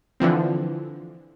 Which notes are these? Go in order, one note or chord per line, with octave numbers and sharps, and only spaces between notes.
D3 E3 F3 C4